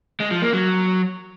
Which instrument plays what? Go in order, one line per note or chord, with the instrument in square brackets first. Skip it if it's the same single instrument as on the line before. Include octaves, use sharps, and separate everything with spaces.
[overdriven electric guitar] G#3
F3
A#3
F#3